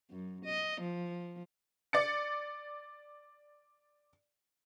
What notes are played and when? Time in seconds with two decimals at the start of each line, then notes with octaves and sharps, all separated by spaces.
0.10 F#2
0.45 D#5
0.81 F3
1.93 D5 A6 C#7